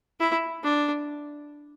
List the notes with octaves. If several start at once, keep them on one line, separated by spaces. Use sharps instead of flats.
E4
D4